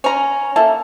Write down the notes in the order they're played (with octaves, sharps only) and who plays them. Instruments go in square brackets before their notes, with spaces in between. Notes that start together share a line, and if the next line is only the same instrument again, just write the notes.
[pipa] C#4 A#5
[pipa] A#3 [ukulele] A4 E5 A5